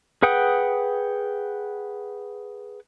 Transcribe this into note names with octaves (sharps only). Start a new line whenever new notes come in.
G#4 B4 F#5 G5 D#6